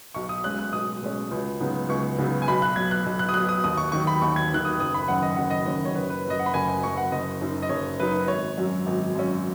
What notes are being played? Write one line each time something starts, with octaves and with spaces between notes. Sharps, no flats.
B1 C#6
D#6
B2 G#3 C#4 F#6
F#6
B1 D#6
B2 G#3 C#4
C#2
C#3 F#3 B3 D#4
C#2 C#6
C#3 F#3 B3 D#4
G#5
B1 B5
F#6
B2 F#3 G#6
F#6
B1
F#6
D#6
B2 F#3 F#6
D#6
D#2 D#6
C#6
D#3 F#3 C#6
B5
D#2 C#6
G#6
D#3 F#3 F#6
D#6
F#1 D#6
B5
F#2 D#3 F#3 C#4 F#5
D#5
F#1 F#5
D#5
F#2 D#3 F#3 C#4
C#5
F#1 B4
B4
F#2 F#3 D#5
F#5
B5
F#1 G#5
G#5
F#2 F#3 C#6
F#5
F#1 D#5
F#2 F#3 D#4
D#5
F#1 C#5
F#2 F#3 D#4 B4
G#1 C#5
F#2 F#3 C#4
G#1
F#2 F#3 C#4